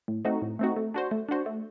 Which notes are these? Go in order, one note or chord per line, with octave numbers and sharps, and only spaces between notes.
A2
A3 C4 D#4 F#4
A2
A3 C4 D#4 F#4
A3
D4 F#4 C5
A3
D4 F#4 C5
A3